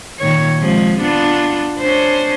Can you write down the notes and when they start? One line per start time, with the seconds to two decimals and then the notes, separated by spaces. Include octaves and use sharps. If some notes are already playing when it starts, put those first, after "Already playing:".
0.19 A#2 D#3 C#5
0.59 C3 F3 G#3
1.00 B3 D4 F4
1.80 C#4 D4 C5